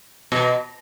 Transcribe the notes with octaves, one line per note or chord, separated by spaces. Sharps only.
B2